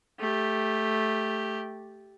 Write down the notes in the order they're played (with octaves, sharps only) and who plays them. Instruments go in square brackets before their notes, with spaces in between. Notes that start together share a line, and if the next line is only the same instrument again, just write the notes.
[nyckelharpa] A3 G4